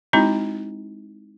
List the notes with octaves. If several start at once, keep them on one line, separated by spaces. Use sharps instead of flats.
G#3 C4 D#4 E4 F#4